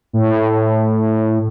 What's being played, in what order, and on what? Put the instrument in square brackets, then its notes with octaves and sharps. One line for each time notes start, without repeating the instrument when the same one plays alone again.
[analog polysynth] A2